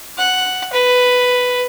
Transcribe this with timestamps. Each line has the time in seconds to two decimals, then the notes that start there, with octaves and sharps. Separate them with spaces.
0.18 F#5
0.73 B4